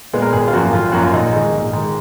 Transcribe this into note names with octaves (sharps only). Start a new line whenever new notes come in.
A#2 G#3 B3
A#4
G#1 G#4
F4
F#2 F3 A#3 F#4
G#1 F4
F#2 F3 A#3 F#4
F4
A#1 D#4
G#2 D#3 G#3
A#1
G#2 D#3 G#3